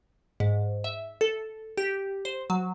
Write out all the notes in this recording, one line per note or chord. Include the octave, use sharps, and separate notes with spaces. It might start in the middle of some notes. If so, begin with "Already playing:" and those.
G#2
E5
A4
G4
C5
F#3